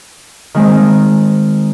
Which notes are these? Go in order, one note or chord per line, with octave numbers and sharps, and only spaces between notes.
D#3 G#3 C4